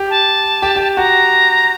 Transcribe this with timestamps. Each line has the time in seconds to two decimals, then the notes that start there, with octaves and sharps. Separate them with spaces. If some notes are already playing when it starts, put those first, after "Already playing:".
Already playing: G4
0.10 A5
0.62 G4
0.76 G4
0.97 F#4 A#5